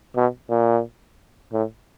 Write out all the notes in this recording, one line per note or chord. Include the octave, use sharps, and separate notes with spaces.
B2
A#2
A2